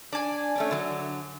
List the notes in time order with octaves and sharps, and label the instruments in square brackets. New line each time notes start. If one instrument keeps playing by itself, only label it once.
[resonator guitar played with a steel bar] D4 [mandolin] D5 G#5
[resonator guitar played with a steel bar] A3 C#4 D4
D3 F#3